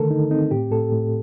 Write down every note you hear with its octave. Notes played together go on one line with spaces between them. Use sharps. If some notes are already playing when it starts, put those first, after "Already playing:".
Already playing: D3 D#3 A3 A4 A#4
D3 D#4
C4 D#4
A2 G4
A2 A4
A2